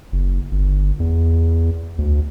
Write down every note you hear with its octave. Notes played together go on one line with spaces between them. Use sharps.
F#1
G1
E2
D2